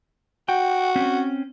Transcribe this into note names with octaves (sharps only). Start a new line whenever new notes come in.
F#4 G5
C4 C#4